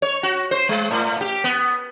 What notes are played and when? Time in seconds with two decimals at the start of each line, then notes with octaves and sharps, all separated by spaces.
0.02 C#5
0.23 F#4
0.51 C5
0.69 G#3
0.91 A2
1.21 G4
1.44 B3